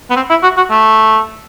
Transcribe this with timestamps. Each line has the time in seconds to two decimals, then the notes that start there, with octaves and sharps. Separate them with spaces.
0.10 B3
0.16 C4
0.30 E4
0.43 F#4
0.57 F#4
0.70 A3